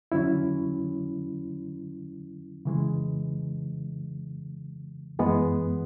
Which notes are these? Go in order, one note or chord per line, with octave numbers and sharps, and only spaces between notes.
D3 F#3 C#4 E4
C#3 E3 G#3
F#2 E3 G#3 B3